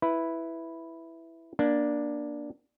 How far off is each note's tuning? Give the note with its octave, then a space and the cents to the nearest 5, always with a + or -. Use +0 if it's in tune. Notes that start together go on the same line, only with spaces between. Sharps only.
E4 +0 B4 +0
A#3 +25 D4 +0